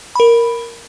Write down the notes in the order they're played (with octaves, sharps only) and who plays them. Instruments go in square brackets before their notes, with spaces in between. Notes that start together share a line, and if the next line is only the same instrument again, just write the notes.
[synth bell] A#4 B5